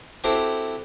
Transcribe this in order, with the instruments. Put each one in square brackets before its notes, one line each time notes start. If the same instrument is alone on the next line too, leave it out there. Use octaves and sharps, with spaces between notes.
[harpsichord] C4 E4 F#4 G4 A4 C5